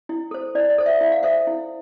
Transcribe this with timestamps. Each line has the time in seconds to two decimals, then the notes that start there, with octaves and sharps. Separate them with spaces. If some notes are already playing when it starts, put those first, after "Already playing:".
0.09 E4
0.31 A4 C5
0.55 E4 D5
0.70 D5
0.78 A4 C5
0.86 E5
1.01 E4 E5
1.12 F5
1.23 A4 C5 E5
1.47 E4